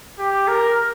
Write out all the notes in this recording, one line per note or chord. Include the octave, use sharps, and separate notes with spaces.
G4
A#4